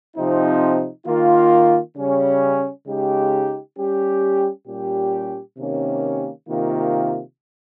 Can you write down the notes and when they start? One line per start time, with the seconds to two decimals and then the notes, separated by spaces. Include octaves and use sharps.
0.17 C3 F3 C4 D#4
1.06 D#3 A#3 F4
1.97 C#3 G3 C#4
2.87 C#3 G#3 D#4 G4
3.78 G3 C#4 G4
4.67 A#2 G3 C#4 G4
5.57 C3 D#3 A#3 C#4 G4
6.48 C3 D#3 A#3 F4